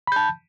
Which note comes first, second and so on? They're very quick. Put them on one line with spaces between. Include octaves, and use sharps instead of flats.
B5 G6 A5